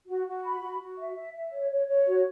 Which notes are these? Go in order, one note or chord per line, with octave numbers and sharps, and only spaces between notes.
F#4
F#4
B5
F#4
F#4
E5
E5
E5
C#5
C#5
C#5
F#4